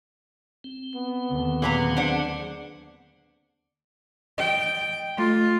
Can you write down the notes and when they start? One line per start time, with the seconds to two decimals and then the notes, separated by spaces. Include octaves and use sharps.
0.64 C4
0.95 B3
1.30 D#2 D3
1.62 A#2 F#3 C4 G#4 B4 A#5
1.96 D4 C5 F#5
4.38 D#5 G5
5.18 A3 F4